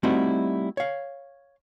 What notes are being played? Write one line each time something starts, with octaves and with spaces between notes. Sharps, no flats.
G3 A3 C4 D#4 E4 F#4
C#5 F5